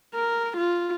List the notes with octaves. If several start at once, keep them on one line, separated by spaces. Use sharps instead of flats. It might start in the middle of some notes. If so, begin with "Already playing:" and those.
A#4
F4